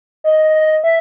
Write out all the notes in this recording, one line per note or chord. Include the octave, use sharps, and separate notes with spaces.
D#5
E5